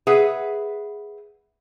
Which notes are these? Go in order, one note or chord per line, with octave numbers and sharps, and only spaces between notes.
G#4 B4 E5 F#5